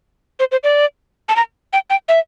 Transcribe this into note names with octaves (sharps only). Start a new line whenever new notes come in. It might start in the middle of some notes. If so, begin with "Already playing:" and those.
C5
C5
D5
A5
A#5
G5
G5
E5